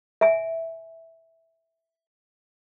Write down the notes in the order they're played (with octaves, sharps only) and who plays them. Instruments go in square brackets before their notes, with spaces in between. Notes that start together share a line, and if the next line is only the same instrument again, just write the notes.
[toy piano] E5 G#5